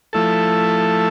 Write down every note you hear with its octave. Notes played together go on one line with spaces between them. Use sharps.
F3 A3 E4 A4